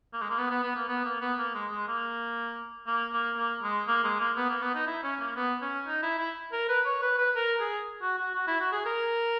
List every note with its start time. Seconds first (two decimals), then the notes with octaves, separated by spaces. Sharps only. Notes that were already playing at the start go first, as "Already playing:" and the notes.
0.13 A#3
0.22 G#3
0.30 A#3
0.38 B3
0.51 B3
0.64 B3
0.76 A#3
0.89 B3
1.05 A#3
1.21 B3
1.38 A#3
1.54 G#3
1.71 G#3
1.88 A#3
2.87 A#3
3.13 A#3
3.37 A#3
3.63 G#3
3.87 A#3
4.04 G#3
4.20 A#3
4.37 B3
4.50 A#3
4.62 B3
4.75 D#4
4.87 E4
5.03 C#4
5.20 A#3
5.36 B3
5.62 C#4
5.87 D#4
6.03 E4
6.19 E4
6.53 A#4
6.69 B4
6.86 C#5
7.02 B4
7.19 B4
7.36 A#4
7.60 G#4
8.02 F#4
8.19 F#4
8.35 F#4
8.48 E4
8.60 F#4
8.72 G#4
8.85 A#4